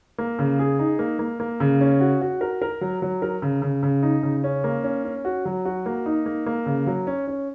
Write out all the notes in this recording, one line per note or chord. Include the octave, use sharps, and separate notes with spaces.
A#3
C#3
G#4
D#4
A#3
A#3
A#3
C#3
C#4
F#4
F#4
A#4
A#4
F#3
F#3
A#4
C#3
C#3
C#3
D#4
C#3
C#4
A#3
C#4
C#4
F#4
F#3
F#4
A#3
D#4
A#3
A#3
C#3
F#3
C#4
C#4